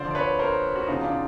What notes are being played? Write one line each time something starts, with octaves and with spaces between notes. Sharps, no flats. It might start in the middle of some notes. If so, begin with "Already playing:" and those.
Already playing: D2 D3 F3 C5 D5
D5
B4 C#5
A#4 C5
F#4
E2 C#3 F3 D#4 F4
D4